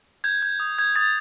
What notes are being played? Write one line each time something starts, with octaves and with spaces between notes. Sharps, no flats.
G6 G#6
G6
D#6
G6 G#6
D#6 A6